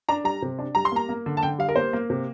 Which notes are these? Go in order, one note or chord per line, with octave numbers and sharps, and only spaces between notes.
D4 A#5
G3 A#5
C3
D4
G3 A#5
C6
A#3 A#5
A#3
D3
A5
D3 G5
G3 F5
A#4
A#3 C5
A#3
C3